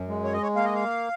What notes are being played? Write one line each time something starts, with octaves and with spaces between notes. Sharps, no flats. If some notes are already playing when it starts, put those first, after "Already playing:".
Already playing: F#2
G#3
C#5
D#5
C#5
A#3 F5
D#5
F5